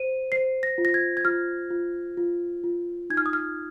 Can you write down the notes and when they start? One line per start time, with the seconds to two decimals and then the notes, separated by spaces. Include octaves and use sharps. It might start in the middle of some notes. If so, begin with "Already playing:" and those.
Already playing: C5 D#7
0.32 C5 C7
0.63 A#6
0.78 F4
0.85 A#6
0.94 G#6
1.17 G#6
1.25 F4 F6
1.71 F4
2.17 F4
2.64 F4
3.10 D#4 G#6
3.17 F6
3.26 D#6
3.33 F6